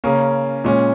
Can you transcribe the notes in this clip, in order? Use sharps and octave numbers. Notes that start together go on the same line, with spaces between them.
C#3 A#3 C#4
A#2 G#3 C#4